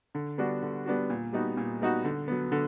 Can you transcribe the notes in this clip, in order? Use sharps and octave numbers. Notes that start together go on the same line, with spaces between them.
D3
G3 B3 D4 F#4
D3
G3 B3 D4 F#4
A#2
G3 B3 D#4 F#4
A#2
G3 B3 D#4 F#4
D3
F#3 B3
D3